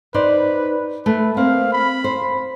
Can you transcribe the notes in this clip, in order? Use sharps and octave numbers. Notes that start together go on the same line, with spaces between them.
D#4 B4 C5 D5
A3 B4
A#3 C4 F5
B5
C5